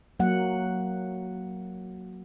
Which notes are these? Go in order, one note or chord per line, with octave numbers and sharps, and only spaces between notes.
F#3 A#3 F#5